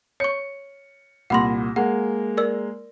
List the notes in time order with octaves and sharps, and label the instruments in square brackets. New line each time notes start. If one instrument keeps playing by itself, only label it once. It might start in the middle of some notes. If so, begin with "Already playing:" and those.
[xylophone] C#5 C#6 [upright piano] C#7
[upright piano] C2 A#2 A#6 [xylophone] F#5 B5 C6
[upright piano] G#3 A#3 [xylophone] F#5
[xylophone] A#4 D5 E6